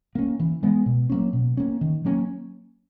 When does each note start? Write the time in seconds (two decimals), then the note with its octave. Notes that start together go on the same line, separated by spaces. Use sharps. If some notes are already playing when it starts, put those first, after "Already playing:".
0.15 A#3 C#4
0.39 E3
0.63 G#3 B3
0.86 B2
1.10 F#3 A#3 C#4
1.33 B2
1.57 A#3 C#4
1.81 D#3
2.05 F#3 A#3 C#4